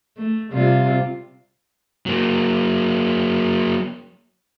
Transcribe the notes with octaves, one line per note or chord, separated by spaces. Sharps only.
A3
C3 G3 F4
F#3 A#3